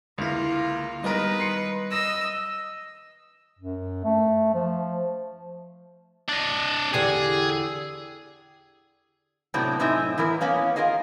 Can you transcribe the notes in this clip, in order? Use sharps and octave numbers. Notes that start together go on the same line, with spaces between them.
C#2 D3 A#3 E4 F4 F5
D#3 G3 G#3 B3 A#4 B4 D#5
C6 C7 C#7
D#5 E6 A#6
F#2
A3
F3
D4 D#5
E2 D3 G4 G#4
A2 C3 F#3 B3 C4 D4
F#2 A2 C4 D#4 E5 G#5
E3 B3 C#4 E4 A#4
A#3 B3 C#4 F5
F4 G#4 A#4 D#5 F5